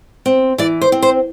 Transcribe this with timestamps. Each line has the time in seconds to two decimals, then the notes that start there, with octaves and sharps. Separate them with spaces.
0.26 C4
0.58 E3 D5
0.81 C5
0.92 C4
1.02 C5